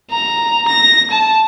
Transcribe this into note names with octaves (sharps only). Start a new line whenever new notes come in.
A#5
A#6
A5